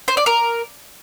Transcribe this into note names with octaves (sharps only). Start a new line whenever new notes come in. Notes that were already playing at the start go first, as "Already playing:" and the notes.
C5
D5
A#4